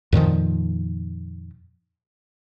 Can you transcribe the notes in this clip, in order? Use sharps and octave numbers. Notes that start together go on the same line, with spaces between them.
F2 A#2 D#3 F3